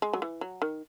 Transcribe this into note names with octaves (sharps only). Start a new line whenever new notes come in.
G#3
F#3
E3
F#3
D#3